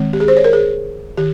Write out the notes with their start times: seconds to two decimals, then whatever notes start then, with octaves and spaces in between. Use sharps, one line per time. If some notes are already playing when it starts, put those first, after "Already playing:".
Already playing: D#3 G#3 C4
0.13 G4
0.20 G#4
0.28 C5
0.37 C#5
0.44 A#4
0.53 G#4
1.17 D#3 G4